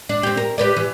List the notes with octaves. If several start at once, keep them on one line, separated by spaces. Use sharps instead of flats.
D4
C4 G4
A#4
G4 B4 D5
E3 B4